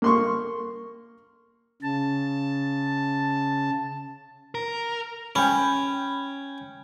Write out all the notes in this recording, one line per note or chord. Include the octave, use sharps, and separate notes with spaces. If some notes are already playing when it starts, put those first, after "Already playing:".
A#3 C6 C#6
C#3 A5
A#4
C#4 G5 B5